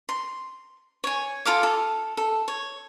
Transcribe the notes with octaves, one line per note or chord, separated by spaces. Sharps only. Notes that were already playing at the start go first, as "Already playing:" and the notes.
C6
C#5 G#5
F4 A4 F5 D6
A4
A4
C#5